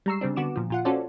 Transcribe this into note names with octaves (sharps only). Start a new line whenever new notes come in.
G3 G#3 A#5 C#6 E6 C7
C#3 G3 C4 D4
D3 B3 F#4 D6 E7
A#2 F3
A#2 F4 F#5
C#4 F4 F#4 A4 C5 D5